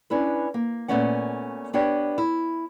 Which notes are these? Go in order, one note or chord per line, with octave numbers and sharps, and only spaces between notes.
C#4 D4 E4 B4
A#3
A#2 F3 A3 B3 C#4 F#5
B3 D4 G4 C#5
E4